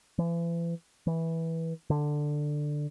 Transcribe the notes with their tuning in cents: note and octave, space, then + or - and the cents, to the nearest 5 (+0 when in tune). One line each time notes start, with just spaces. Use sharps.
E3 +40
E3 -10
D3 +10